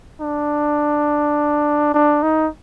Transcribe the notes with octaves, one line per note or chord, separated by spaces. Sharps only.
D4
D4
D#4